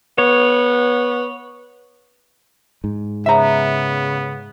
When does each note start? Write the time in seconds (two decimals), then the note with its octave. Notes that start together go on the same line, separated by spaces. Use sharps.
0.18 B3 C#5
2.84 G#2
3.26 C#3 B3 E5 A#5